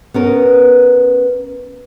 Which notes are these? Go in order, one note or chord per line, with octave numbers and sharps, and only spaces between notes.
B3 C#4 A#4